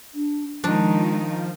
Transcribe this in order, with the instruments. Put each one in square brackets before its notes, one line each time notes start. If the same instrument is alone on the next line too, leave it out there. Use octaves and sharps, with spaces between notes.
[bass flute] D4
[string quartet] D#3 D#4 [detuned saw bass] F3 [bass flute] G#3 [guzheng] D4